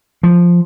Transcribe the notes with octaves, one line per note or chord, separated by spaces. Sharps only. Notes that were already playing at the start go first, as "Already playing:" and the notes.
F3